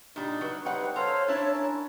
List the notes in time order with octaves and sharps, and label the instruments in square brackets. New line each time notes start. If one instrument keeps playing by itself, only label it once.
[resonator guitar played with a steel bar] A#2 G3 [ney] D4 [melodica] D#4
[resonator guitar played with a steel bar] F#3 [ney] B4
[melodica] G3 C4 D#4 [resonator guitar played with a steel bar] C#5 F#5
[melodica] A4 C5 F5 [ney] C#5 [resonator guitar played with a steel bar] A#5
[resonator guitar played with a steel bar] D4 E4 [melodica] E5 A5
[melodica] C#4 A#4 A5